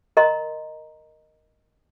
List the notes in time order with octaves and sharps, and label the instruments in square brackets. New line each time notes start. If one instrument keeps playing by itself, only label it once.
[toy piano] A#4 D#5 A#5 C6